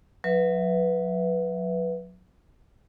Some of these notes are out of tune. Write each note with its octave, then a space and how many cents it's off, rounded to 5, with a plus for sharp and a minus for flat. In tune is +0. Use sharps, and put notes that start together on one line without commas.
F#3 -30 B4 +0 E5 +0